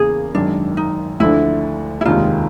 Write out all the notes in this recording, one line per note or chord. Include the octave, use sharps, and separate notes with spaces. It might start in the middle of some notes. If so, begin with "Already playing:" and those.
Already playing: E2 C#3 A#3 G#4
G#1 F#2 D#3 D4
D#4
D2 D3 F3 A3 D4 E4
E4
F1 D#2 D#3 G#3 F4